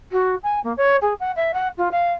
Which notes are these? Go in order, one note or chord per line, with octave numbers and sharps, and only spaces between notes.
F#4
G#5
A#3
C#5
G#4
F#5
E5
F#5
F4
F5